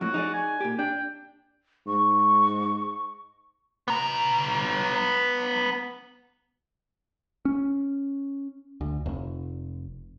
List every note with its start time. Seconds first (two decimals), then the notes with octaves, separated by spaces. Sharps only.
0.01 F2 A2 F#4
0.14 D#4 G#4 D5
0.34 G#5
0.61 A#2 G4
0.79 D4 G5
1.87 G#2 C#6
3.88 B3 A#5
7.45 C#4
8.81 D2
9.06 F1